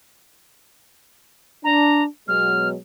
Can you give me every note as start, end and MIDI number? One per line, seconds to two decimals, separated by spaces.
1.64 2.05 62
1.64 2.03 82
2.28 2.76 47
2.28 2.76 54
2.28 2.76 56
2.28 2.68 89